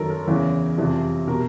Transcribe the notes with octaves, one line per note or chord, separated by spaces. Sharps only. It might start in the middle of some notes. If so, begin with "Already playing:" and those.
Already playing: F#2 D#3 A4 A#4
A#4
E2 C#3 E3
F2 C3 E3
B2 A#4